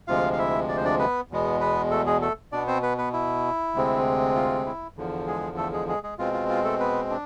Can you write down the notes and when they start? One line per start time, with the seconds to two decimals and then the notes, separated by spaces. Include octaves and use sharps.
0.08 D2 C3 F3 G#3 F4 F5
0.33 F5
0.38 E4 E5
0.69 D5
0.77 C5
0.85 D4 D5
0.99 B3 B4
1.31 E2 B2 G#3 B3
1.60 B3 B4
1.91 A3 A4
2.06 G#3 G#4
2.22 A3 A4
2.52 B2 B3 D4 D5
2.67 C4 C5
2.83 B3 B4
2.98 B3 B4
3.13 E4
3.74 D2 C3 G#3 C4
4.35 F4
4.66 E4
4.97 E2 D3 F3
5.27 G#3 G#4
5.57 A3 A4
5.73 G#3 G#4
5.88 G#3 G#4
6.03 G#3 G#4
6.18 B2 G#3 C4 F4
6.33 F4
6.49 F4
6.64 A3 A4
6.80 B3 B4
7.10 D4